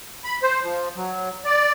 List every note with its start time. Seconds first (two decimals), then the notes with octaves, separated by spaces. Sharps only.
0.24 B5
0.43 C5
0.63 F3
0.96 F#3
1.45 D5